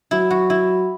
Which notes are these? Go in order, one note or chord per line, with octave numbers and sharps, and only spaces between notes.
F#3 E4
F#4
E4